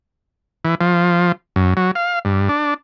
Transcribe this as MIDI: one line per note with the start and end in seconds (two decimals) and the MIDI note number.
0.65 0.75 52
0.81 1.32 53
1.56 1.74 42
1.77 1.91 54
1.95 2.19 77
2.25 2.49 43
2.49 2.74 62